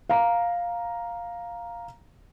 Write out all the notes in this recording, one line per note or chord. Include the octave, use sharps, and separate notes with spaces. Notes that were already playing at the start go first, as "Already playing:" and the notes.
F5 A#5